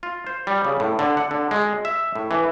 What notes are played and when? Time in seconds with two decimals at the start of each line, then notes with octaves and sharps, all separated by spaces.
0.03 F4
0.27 C5
0.47 G3
0.65 C#3
0.80 A2
0.99 D3
1.17 F#5
1.31 D3
1.51 G#3
1.85 E5
2.15 A2
2.31 E3